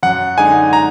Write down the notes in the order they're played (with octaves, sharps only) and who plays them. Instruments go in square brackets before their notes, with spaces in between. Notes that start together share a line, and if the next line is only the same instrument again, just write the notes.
[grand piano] F#2 [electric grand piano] F#5
[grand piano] D3 G#3 D#4 [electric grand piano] G#5
[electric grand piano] A#5